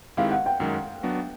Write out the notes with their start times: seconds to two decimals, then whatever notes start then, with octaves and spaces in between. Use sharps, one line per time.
0.17 D#3 G#3 C4 E4 G4 F5
0.31 F#5
0.46 G5
0.60 F#2 D#3 G#3 C#4
1.03 F#3 B3 D4 F#4